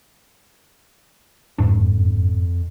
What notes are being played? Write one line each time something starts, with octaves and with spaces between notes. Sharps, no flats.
F#1 F2 G#2 D4